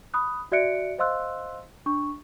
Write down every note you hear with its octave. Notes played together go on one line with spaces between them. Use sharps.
B5 D#6 F#6
F#4 D5 E5 F#6 C#7 D7
C5 D#5 F5 C6 E6 F#6
D4 C#6